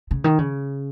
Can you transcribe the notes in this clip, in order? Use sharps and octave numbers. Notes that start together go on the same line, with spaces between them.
C#3
D#3
C#3